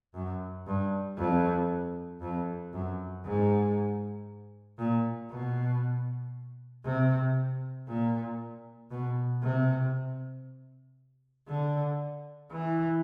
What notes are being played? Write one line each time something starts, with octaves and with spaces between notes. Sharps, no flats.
F#2
G2
F2
F2
F#2
G#2
A#2
B2
C3
A#2
B2
C3
D3
E3